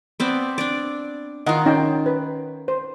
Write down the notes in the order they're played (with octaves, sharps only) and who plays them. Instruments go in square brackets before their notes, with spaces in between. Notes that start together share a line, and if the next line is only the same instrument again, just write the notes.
[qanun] B3 C4 D5
D4 D5
[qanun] D#3 F4 [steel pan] D#5 F#5 A#5
[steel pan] C#4 D#4 G5
B4
C5